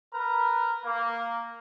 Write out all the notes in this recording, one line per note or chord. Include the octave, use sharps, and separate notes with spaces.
A#4 B4 A#5
A#3